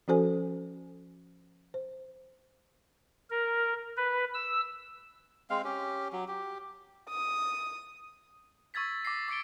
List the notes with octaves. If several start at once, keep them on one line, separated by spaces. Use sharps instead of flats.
F3 C#4 F#4 A4 C5 G#5
C5
A#4
B4
E6
G#3 C4 F5
C#4 G4
F#3
G4
D#6
C#6 E6 G#6 A6 B6
D6 A#6 C7
D6 A6 C#7 D7 G7